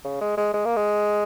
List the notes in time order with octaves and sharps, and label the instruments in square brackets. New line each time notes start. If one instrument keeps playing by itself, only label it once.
[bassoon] C#3
G#3
G#3
G#3
A#3
G#3